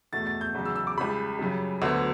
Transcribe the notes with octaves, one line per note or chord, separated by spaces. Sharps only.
E2 B2 A3 A6
A6
G6
E2 C#3 F#3
E6
E6
D6
C#2 C#3 G3 B5
F#2 C#3 G3
D2 D3 F#3 B3